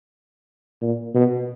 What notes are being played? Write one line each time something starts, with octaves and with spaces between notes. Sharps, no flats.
A#2
B2